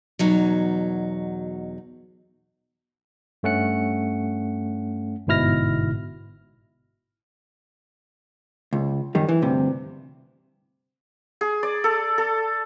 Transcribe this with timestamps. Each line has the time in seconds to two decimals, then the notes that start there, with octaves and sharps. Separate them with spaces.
0.19 E2 B2 F#3 D#4
3.43 G2 A3 C#4 F#5 C#7
5.27 G1 G#2 B2 E4 F6 A#6
8.73 C#2
9.15 F#2 D#3 G3
9.29 E3
9.42 D2 G2 C3
11.41 G#4
11.63 D5
11.84 A4
12.18 A4